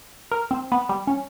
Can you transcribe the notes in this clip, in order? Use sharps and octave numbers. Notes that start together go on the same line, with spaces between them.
A#4
C4
B3
G3
C#4